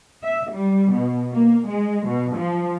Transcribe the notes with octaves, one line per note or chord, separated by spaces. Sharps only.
E5
G3
B2
A#3
G#3
B2
F3